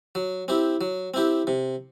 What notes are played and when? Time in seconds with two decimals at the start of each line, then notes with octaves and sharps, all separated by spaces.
0.15 F#3
0.48 C4 E4 G4
0.81 F#3
1.14 C4 E4 G4
1.47 C3